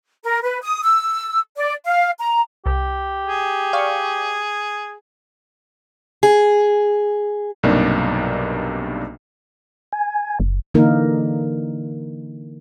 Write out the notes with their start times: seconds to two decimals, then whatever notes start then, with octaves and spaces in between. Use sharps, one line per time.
0.23 A#4
0.43 B4
0.63 D#6
0.83 E6
1.57 D5
1.85 F5
2.19 A#5
2.66 C2 G4
3.27 G#4
3.73 D5 F5 C#6
6.23 G#4
7.63 B1 G2 C3 A#3 D4 D#4
9.92 G#5
10.40 F#1
10.74 D3 E3 A#3 D#4 A#4